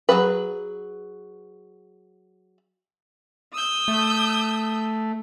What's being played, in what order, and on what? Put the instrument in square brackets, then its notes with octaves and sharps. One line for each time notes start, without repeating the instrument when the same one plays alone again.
[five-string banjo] F#3 A#3 G#4 B4
[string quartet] D#6 E6 G6
[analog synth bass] A3